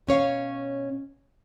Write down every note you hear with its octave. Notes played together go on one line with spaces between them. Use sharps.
B2 C#4 C#5 F5